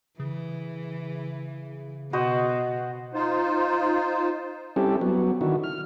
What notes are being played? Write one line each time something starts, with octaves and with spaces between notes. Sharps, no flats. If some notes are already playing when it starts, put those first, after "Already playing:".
C#3 E3
B2 F#4 C5 D#5
D#4 F4 C5
G3 C4 C#4 E4 G4 A4
F#3 B3
D3 D#3 E4 F#4
F6